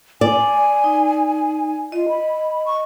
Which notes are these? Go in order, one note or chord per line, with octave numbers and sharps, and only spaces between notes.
D5 G#5
D#4
F4 D#5
B5
C#6